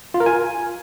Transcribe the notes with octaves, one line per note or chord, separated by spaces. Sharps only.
F4
A#4
G#5